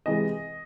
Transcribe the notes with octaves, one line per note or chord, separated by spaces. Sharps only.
C3 E3 G#3 D#5